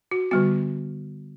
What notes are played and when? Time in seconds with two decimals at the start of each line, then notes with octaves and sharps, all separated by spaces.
0.11 F#4
0.31 D3 G3 B3 F#4